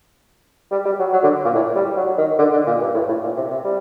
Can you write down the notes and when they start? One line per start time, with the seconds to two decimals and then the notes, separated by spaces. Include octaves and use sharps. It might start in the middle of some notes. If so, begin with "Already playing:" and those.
0.71 G3
0.85 G3
0.99 F#3
1.13 F#3
1.23 D3
1.45 A#2
1.55 A2
1.76 G3
1.97 F#3
2.18 D#3
2.39 D3
2.52 D3
2.66 A#2
2.81 G2
2.94 A2
3.08 A2
3.23 A#2
3.37 C3
3.50 C3
3.64 G3